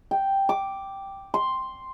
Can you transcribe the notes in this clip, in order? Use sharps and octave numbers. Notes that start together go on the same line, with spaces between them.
G5
D6
C6